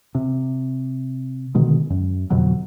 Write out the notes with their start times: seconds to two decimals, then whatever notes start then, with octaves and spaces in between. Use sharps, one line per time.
0.15 C3
1.55 B2 D3 D#3 G#3
1.90 F#2
2.30 F2 B2 D3 F#3